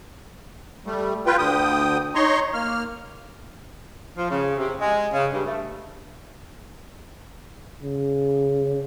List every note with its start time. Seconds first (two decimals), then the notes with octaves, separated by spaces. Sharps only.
0.86 G3 A3
1.26 F4 B4 G5
1.38 D2 D3 G5 D#6
2.15 D#4 C#5 A#5 C6 C#6
2.54 A#3 F6
4.17 F3
4.30 C#3
4.57 C3
4.81 G#3
5.14 C#3
5.33 G2
5.47 A3
7.82 C#3